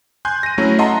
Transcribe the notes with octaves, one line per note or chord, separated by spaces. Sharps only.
G#5 C6 F#6 G6
A#6 D#7
F#3 A3 C#4 E4
D#5 E5 F#5 A5 A#5 C6